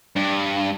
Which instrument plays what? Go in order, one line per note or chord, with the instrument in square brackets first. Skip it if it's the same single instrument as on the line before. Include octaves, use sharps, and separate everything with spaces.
[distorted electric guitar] G2